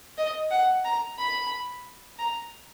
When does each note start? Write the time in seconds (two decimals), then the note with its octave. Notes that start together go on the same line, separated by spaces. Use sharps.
0.18 D#5
0.51 F#5
0.85 A#5
1.18 B5
2.19 A#5